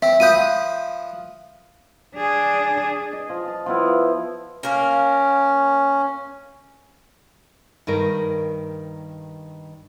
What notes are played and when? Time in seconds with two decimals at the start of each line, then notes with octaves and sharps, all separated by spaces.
0.02 C4 E5
0.20 F3 B4 D#6 G6 D#7
2.15 D4 G#4
3.13 D#5
3.30 F3
3.48 A5
3.66 F3 B3 E4
4.63 A#3 C#4 A#4
7.87 G2 D#3 A#4